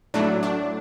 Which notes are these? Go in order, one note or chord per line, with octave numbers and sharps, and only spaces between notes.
A2 F#3 A3 D4
D4